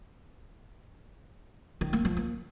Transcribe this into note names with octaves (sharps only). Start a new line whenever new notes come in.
D#3
A#3
F3
A#3